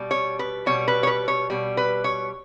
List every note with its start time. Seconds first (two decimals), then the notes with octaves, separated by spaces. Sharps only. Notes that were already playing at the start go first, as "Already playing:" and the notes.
Already playing: B2 G3
0.11 C#5
0.39 B4
0.66 B2 G3 C#5
0.88 B4
1.03 C#5
1.07 B4
1.28 C#5
1.50 B2 G3
1.77 B4
2.04 C#5